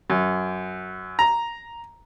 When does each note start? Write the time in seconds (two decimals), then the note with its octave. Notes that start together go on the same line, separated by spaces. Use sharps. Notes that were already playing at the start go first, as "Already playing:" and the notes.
0.10 F#2
1.19 A#5